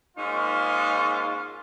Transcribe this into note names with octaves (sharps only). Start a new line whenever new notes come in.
G#2 A#3 C#4 D#4 F4